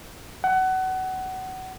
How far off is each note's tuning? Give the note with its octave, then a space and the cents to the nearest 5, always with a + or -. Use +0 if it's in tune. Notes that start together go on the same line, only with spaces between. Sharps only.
F#5 +25